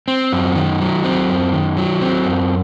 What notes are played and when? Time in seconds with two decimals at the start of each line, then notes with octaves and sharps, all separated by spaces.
0.08 C4
0.32 F#2
0.55 D#3
0.81 F#3
1.04 C4
1.29 F#2
1.53 D#3
1.77 F#3
2.01 C4
2.26 F#2